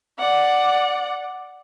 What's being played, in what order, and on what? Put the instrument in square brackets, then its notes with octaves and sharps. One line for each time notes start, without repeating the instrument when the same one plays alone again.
[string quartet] D5 F#5